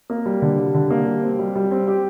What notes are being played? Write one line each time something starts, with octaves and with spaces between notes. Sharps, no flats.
A#3
G3
D3
G3
D3
A#3
G3
C4
G3
G3
C4
G4